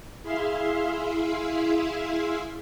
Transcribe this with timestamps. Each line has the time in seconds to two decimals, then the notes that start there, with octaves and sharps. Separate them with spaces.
0.23 E4 G#4 E5 F5 C6